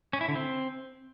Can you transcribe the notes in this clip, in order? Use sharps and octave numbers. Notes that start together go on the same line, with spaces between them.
C#4
E4
D3
C4